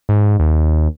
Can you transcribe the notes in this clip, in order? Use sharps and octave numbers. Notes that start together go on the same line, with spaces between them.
G#2
D#2